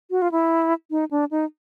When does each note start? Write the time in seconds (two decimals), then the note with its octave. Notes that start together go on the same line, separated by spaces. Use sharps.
0.11 F#4
0.22 F4
0.32 E4
0.91 D#4
1.11 D4
1.31 D#4